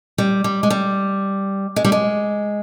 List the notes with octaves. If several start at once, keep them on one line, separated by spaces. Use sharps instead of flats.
G3
G3
G#3
G3
G#3
G3
G#3